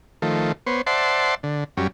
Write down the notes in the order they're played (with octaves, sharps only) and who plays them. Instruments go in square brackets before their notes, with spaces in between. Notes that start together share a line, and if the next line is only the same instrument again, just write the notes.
[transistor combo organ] D#3 F3 A3
B3 C5 C#5
C5 D5 E5 F#5 A5 C6
D3
F#2 G3 C#4